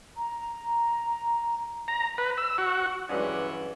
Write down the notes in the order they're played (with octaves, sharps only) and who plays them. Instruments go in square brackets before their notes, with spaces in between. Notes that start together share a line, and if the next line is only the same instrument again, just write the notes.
[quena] A#5
[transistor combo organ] A#5
B4
E6
F#4
[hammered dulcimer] G2 D5 [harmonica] E3 F#5 [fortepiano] F#3 G#3 C#4